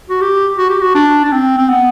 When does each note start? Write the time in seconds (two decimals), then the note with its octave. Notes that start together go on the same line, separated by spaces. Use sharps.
0.10 F#4
0.21 G4
0.58 F#4
0.69 G4
0.81 F#4
0.95 D4
1.24 D4
1.32 C4
1.58 C4
1.69 B3